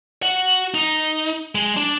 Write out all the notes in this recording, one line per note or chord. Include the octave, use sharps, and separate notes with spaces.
F#4 F#5
D#4
G#3
D4